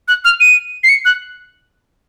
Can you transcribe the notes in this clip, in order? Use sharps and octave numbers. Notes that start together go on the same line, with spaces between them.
F#6
F6
D#7
C7
C#7
F#6